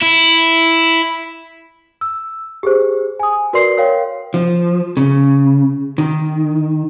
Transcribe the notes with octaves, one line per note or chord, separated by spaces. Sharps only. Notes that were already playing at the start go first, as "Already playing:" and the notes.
E4
E6
G4 G#4 C5
G#5 D#6
F#4 A#4 B4 D5 C6 C7
A#4 C#5 F5 G5
F3
C#3
D#3